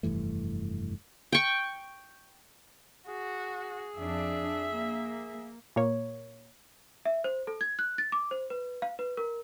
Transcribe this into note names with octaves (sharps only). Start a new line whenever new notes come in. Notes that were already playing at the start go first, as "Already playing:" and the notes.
F1 G2 E3 A3
G5 C#6
F#4 G#4
F2 D4 E5
A#3
A#2 A#3 C#5
E5
C5
A4
G#6
F#6
A6
D6
C5
B4
F5
B4
A#4